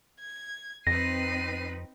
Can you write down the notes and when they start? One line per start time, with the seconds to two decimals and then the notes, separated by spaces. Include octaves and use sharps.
0.20 G#6
0.87 F2 C4 D#4 B4 A#6 C7 D#7